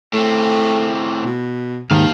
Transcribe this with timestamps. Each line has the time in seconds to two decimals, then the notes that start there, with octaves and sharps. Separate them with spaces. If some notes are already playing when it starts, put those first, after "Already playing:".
0.13 A2 A3 C4
1.25 B2
1.91 D#2 G#2 D#3 F5 A5